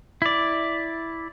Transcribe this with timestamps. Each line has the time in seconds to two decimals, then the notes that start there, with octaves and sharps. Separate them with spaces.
0.22 E4 D5